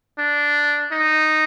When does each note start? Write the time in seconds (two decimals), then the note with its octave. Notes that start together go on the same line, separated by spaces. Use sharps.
0.19 D4
0.92 D#4